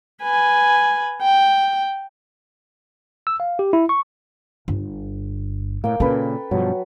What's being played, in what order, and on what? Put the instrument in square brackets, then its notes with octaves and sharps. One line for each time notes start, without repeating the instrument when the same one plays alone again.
[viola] B4 G#5
G5
[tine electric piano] E6
F5
G4
E4
C#6
[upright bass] G1
[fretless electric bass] A2 [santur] A#3 G5
[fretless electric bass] A#2 C#3 [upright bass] C#4 [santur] A4 B4
[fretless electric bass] G2 B2 F3 [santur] F#3